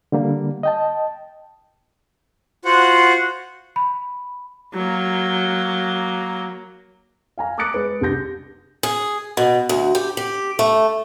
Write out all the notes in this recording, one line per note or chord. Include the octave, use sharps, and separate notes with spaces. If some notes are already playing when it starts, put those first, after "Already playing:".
D3 G3 A#3
D#5 G5 A5
F4 F#4 C5 F#5
B5
F#3 A#3
F5 G#5 A#5
D6 D#6 F#6 A6 C#7 D7
G#3 B4
C2 G3 D4 G6 A#6
G#4
B2
D2
G4
G4
A3